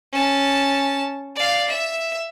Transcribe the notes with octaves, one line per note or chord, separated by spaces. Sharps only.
C#4 A5
D5 F5
E5